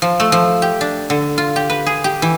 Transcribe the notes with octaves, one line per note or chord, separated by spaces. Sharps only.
F3
A3
F3
G4
D4
D3
F4
G4
B4
G#4
G4
E3